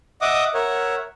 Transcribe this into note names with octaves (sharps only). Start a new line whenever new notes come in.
D#5 E5 F#5 D6 D#6
A#4 C#5 E5 F#5